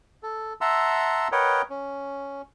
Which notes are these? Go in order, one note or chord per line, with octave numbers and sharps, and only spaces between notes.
A4
E5 F#5 A5 A#5 C6 E6
A#4 B4 C#5 D#5 F#5 G5
C#4